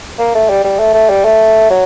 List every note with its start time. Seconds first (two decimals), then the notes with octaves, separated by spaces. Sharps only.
0.19 A#3
0.35 A3
0.49 G3
0.65 G3
0.79 A3
0.94 A3
1.10 G3
1.25 A3
1.70 F#3